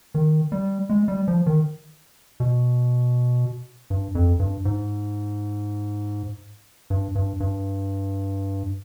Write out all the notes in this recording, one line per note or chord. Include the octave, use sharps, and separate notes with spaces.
D#3
G3
G#3
G3
F3
D#3
B2
G2
F2
G2
G#2
G2
G2
G2